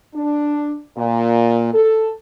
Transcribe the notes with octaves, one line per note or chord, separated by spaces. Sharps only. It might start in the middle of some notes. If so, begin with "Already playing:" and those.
D4
A#2
A4